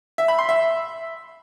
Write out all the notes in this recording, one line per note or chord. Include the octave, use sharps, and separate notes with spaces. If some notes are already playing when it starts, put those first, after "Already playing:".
E5
B5
C6
E5